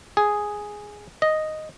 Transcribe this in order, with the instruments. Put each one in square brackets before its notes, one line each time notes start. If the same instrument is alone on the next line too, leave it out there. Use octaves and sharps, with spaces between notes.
[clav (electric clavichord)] G#4
D#5